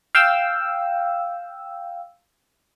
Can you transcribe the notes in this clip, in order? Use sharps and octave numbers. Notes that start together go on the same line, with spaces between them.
F5 G5 E6